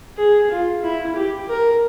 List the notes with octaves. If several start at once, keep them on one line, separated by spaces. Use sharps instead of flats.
G#4
F4
E4
G4
A#4